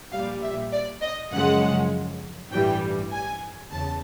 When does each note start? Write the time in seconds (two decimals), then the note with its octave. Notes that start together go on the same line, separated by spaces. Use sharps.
0.12 A#1 A#2 G3 F5
0.42 E5
0.72 D5
1.02 D#5
1.32 F#2 C#3 F3 G#3 F#5
2.52 A1 G2 E3 G3 G5
3.12 G#5
3.72 E2 C#3 A5